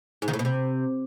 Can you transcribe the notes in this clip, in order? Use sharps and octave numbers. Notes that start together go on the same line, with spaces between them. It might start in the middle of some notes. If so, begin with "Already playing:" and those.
G#2
D#3
A2
B2
C3